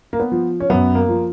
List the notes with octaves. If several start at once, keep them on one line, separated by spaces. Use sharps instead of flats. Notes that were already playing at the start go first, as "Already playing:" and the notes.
A#3
B3
F3
C#4
F#2 B3
A#3
F3